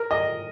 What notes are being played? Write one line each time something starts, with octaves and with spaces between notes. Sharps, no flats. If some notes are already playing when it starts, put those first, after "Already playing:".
Already playing: A#4
D#5